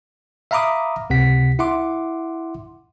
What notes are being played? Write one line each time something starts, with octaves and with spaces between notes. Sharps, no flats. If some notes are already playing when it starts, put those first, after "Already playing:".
E5 F5 A#5 B5 D6 D#6
C#2 C3 F#5 B6
E4 E5 F#5 C6 D6